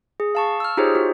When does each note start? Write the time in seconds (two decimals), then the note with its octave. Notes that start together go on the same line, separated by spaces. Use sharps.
0.20 G#4
0.35 F5 A5 C#6
0.60 E6 F6
0.77 D#4 F4 G4 G#4 C5 C#5
0.95 F#4